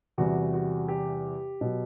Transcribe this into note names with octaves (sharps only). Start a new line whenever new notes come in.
E2 C3 E3 G3 F#4
F#4
G4
B2 F#3